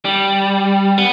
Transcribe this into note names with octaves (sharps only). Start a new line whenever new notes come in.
G3
B3